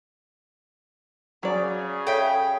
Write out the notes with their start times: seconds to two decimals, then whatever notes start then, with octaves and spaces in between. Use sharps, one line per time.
1.43 C#3 F#3 G#4 D5
2.07 A4 C#5 E5 G5 B5